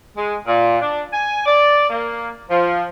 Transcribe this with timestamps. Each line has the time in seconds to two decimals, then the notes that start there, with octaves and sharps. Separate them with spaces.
0.17 G#3
0.47 A#2
0.82 D4
1.13 G#5
1.46 D5
1.90 A#3
2.50 F3